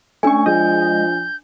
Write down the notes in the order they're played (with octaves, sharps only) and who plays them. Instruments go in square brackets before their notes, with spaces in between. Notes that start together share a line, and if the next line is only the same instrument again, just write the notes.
[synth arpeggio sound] A3 C#4 C#6 [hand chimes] D4 G#5
[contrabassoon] F3 [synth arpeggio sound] G#3 D#5 [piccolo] G6